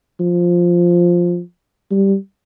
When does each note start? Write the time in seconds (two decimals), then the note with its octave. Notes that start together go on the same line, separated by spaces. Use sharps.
0.20 F3
1.91 G3